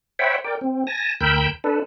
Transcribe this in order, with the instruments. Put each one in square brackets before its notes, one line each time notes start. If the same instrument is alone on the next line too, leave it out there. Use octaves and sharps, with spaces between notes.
[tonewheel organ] C5 C#5 E5 F#5 G5 B5
A#4 D5 G5
C4
G#5 A5 A#6
D2 A#4 G5 B5 E6 G6
D4 A4 B4